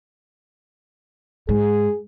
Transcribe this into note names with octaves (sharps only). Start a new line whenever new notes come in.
G#2 G#4